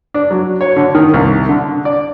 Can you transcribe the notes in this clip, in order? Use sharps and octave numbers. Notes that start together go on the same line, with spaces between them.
D4
F#3
C#5
D3
D#3
C2
D3
D5